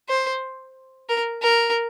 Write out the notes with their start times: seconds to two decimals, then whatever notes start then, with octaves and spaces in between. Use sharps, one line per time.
0.09 C5
1.09 A#4
1.42 A#4